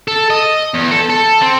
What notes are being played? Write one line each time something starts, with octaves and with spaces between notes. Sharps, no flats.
A4
D#5
E2
A4
A4
C4